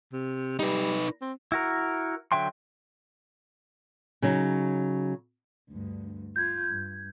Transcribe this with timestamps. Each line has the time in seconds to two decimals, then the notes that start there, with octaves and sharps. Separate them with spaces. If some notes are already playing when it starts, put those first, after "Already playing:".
0.13 C3
0.59 G3 D#4 B4
1.21 C4
1.52 E4 F#4 A#4
2.32 D3 F#3 E5 G5 C6
4.22 C#3 F#3 D#4
5.71 D2 G2
6.36 F4 G6 G#6
6.70 G2